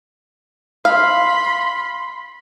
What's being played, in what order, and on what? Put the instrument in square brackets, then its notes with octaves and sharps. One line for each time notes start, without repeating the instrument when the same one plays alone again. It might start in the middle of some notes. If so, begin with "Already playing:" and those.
[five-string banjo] F5 [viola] B5 C6